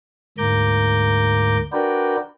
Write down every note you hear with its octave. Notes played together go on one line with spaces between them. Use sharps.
D2 G#2 A#3 A#5 D6 G6
D4 F#4 A#4 B4 D5 G5